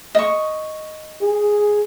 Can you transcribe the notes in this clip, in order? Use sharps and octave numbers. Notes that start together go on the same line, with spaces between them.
D#5 C#6
G#4